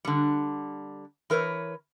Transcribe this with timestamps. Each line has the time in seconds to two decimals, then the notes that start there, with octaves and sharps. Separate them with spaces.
0.05 D3 G3
1.30 E3 A#4 B4 C#5